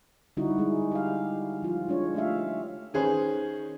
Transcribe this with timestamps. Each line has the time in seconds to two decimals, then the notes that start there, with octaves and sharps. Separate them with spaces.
0.37 D3 G3 D#4 E4 F#4
0.58 G#3 E4
0.92 G4 F5
1.62 F3 F4
1.88 G#3 D4 C#5
2.15 A3 D4 F4 G4 E5 F5
2.94 D#3 C#4 G#4 B4 C5